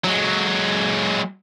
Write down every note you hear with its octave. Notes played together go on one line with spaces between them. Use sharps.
F#3 G#3